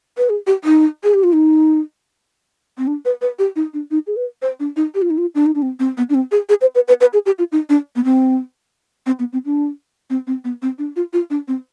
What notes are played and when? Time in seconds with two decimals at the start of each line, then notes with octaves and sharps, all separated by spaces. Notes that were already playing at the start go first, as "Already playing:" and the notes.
0.18 B4
0.30 G#4
0.47 G4
0.64 D#4
1.04 G#4
1.14 G4
1.24 F4
1.33 D#4
2.78 C4
2.87 D4
3.05 B4
3.22 B4
3.39 G4
3.56 D#4
3.74 D4
3.91 D#4
4.07 G#4
4.16 B4
4.42 C5
4.60 D4
4.76 D#4
4.95 G4
5.02 F4
5.10 D#4
5.18 F4
5.35 D4
5.46 D#4
5.55 D4
5.62 C4
5.80 C4
5.98 B3
6.10 D4
6.15 C4
6.32 G#4
6.49 G#4
6.61 C5
6.75 B4
6.88 B4
7.01 B4
7.13 G#4
7.26 G4
7.39 F4
7.52 D#4
7.69 D4
7.96 B3
8.04 C4
9.06 C4
9.19 B3
9.33 C4
9.45 D4
10.10 C4
10.27 C4
10.44 B3
10.62 C4
10.79 D4
10.96 F4
11.13 F4
11.30 D4
11.48 C4